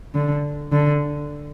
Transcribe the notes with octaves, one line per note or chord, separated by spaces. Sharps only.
D3
D3